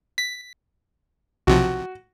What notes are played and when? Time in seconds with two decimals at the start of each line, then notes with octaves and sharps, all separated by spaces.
0.18 B6
1.47 B1 C3 F3 F#4